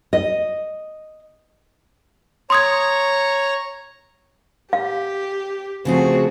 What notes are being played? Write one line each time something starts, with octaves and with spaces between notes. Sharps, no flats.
D#5
C#5 A#5 C6 C#6 D#6 G#6
G4 F5
C#3 F3 A3 C4 F#4 G#4